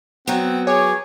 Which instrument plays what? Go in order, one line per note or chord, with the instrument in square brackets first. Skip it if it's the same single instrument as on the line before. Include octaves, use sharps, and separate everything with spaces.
[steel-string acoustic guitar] F#3 B3 [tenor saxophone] C4 [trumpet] F#5
[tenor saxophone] G#4 [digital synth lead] C#5 [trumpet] D6